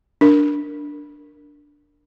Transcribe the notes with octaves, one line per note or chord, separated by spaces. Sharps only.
D4 A#4